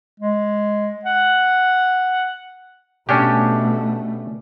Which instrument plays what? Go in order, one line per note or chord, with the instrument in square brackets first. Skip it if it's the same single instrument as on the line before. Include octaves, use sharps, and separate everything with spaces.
[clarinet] G#3
F#5
[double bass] B2 A3 [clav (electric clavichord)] C#4 D4 G4